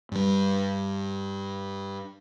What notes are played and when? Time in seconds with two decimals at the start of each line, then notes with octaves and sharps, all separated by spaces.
0.12 G2 G3